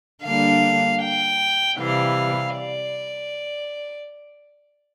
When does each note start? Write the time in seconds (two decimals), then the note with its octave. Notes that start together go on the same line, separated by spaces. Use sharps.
0.23 D3 G3 A#3 D4 F5
1.00 G5
1.77 C3 E3 G3 F5
2.54 D5